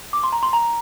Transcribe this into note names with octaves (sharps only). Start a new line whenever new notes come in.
D6
C6
A#5
C6
A#5